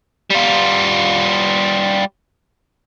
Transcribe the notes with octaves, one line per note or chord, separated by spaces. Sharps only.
G3 F4